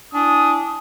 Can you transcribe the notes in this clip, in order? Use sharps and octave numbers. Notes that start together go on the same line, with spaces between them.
D4 E4 G#5 D#6